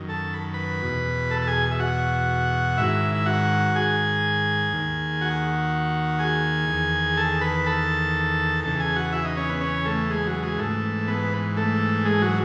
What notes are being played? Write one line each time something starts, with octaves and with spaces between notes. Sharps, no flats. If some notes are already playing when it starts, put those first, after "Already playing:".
Already playing: F#2 D#3
A4 A5
B5
B4 B5
E2 B2
A4 A5
A5
G#4 G#5
E5
F#4 F#5
G#2 D#3 E4 E5
E5
F#4 F#5
G#4 G#5
D#2 D#3
F#4 F#5
G#4 G#5
E2 D#3
A4 A5
B4 B5
A4 A5
E2 C#3 E3 A4 A5
G#4 G#5
F#4 F#5
E4 E5
D#4 D#5
C#4 C#5
B3 B4
C#4 C#5
A3 A4
G#3 G#4
F#3 F#4
G#3 G#4
G#2 E3 A3 A4
B3 B4
A3 A4
G#3 G#4
F#3 F#4